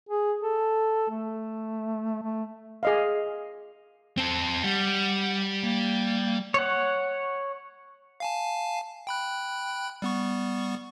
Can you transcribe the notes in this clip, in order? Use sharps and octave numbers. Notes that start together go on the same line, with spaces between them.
G#4
A4
A3
A3
G#4 D#5 F5
C4 A4
G3 F#5
A#3
C#5 F#5
F5 G#5 A5
G5 B5 F#6
G3 B3 C#6